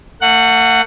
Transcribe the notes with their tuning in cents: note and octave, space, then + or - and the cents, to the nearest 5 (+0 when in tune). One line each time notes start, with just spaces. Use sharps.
A3 +45 F#5 +0